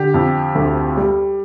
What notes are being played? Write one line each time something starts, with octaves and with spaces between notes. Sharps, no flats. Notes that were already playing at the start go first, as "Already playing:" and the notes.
Already playing: D3 G4
F2
D2
G3